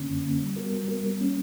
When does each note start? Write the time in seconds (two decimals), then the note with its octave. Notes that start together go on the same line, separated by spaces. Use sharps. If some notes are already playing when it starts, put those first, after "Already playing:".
Already playing: D3 A#3 C#4
0.08 F#2
0.24 D3 A#3 C#4
0.41 G3
0.56 B3 F#4 A#4
0.72 G3
0.88 B3 F#4 A#4
1.04 G3
1.20 A#3 C#4